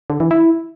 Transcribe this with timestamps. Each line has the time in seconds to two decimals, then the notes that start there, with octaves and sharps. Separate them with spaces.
0.10 D3
0.20 E3
0.31 E4